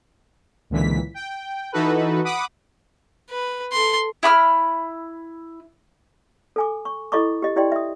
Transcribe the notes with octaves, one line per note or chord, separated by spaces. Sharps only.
C#2 A#2 D3 E3 B6
G5
E3 D#4 F#4 A4 B4
F#5 B5 D6 D#6
B4
A4 C6
E4 B5 D6 F6
A4 G#5 D6
C#6
E4 A4 D#5 B5 C#6 D6
G4 D#5
E4 G4 D5 D#5 G5 C6
E5 D#6